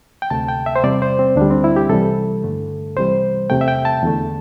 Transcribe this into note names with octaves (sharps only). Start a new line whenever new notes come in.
G5
D2 C3 A3 A5
G5
E5
C5
E2 C3 G3 D5
C5
C4
D2 D3 G3 D4
C4
E4
G4
C2 C3 E3 G3 A4
G2 D3 A3
C2 C3 E3 G3 C5
E2 C3 A3 G5
E5
G5
A5
E2 D3 A3